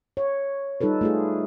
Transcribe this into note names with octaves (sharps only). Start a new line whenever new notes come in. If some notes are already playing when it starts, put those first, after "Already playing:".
C#5
G3 D#4 F4 A4 B4
A3 F4 G#4